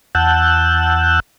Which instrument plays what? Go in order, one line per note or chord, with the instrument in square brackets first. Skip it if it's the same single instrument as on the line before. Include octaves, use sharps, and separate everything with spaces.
[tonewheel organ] E2 F#5 A5 E6 F#6 G6